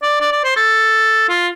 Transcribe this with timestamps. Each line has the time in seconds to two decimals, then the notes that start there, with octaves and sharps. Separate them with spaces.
0.02 D5
0.21 D5
0.32 D5
0.44 C5
0.56 A4
1.29 F4